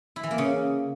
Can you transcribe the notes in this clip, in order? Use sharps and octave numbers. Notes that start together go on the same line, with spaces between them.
E4
E3
A#3
C#3